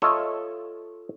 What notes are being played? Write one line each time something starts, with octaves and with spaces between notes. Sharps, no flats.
F4 A4 C#5 D#5 E5